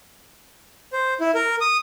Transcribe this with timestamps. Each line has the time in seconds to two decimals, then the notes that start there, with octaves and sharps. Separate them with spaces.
0.93 C5
1.20 E4
1.35 A#4
1.61 D#6